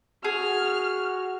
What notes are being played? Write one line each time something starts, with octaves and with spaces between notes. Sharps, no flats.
F#4 G#4 F6